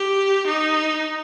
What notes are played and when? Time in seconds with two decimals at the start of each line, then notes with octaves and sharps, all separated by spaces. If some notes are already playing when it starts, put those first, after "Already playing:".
Already playing: G4
0.47 D#4